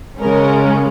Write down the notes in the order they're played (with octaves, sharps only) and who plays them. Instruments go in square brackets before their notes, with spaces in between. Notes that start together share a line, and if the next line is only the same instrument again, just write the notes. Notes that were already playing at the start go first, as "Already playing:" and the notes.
[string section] C#3 G#3 C#4 A#4